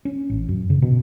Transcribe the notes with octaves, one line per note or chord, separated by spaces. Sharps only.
C#4
A1
F#2
C#3
B2